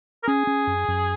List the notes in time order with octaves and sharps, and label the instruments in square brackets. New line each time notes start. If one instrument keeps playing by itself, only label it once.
[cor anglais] A#4
[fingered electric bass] C#4 [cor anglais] G#4
[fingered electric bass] C#4
F#2
F#2